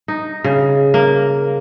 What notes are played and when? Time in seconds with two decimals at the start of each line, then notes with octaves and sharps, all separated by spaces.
0.08 D#4
0.44 C#3
0.94 A#3